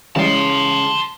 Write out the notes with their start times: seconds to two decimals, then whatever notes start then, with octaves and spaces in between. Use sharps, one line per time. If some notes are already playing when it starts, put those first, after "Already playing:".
0.16 C#3 E3 G3 G#3 A5 C6